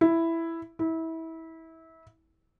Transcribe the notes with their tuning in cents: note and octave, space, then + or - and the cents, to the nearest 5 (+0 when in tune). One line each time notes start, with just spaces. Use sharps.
E4 +5
E4 -25